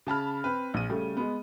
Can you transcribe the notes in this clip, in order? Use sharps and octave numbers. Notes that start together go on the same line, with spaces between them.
C#3 A5 B5 F6
C4 B4
A#1 D#7
C#3 G3 A3
G#3 B3